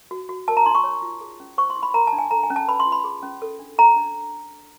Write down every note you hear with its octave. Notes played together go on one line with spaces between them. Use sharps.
F#4
F#4
A#4 A5
A#5
D#4 C6
C#6
C#5
F4
G#4
C#4
C5 C#6
C6
E4
B5
A#4 A#5
A5
D4
G#5
A4 A#5
G#5
C#4
A5
B4 B5
C6
F4
B5
G#4
C#4
A4
D4
A4 A#5
D4